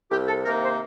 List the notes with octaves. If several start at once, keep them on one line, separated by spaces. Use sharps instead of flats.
C2 G4
A4
C3 D#3 A#3 D#4 A#4
C5